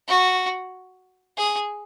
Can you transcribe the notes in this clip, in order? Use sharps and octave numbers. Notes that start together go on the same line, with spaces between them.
F#4
G#4